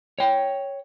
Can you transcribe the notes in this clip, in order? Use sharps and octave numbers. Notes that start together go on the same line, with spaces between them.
C#5 G5